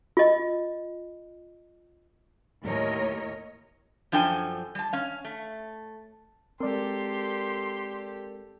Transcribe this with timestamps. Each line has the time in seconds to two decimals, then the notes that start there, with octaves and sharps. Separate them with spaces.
0.17 F4 D#5
2.62 D#2 A2 A#4 C#5 D#5
4.12 F#2 F3 D4 A4 G5 G#5
4.75 G3 A5
4.93 C#4 F5
5.25 A3
6.60 G#3 C4 G4 A4 A#4 D5 C6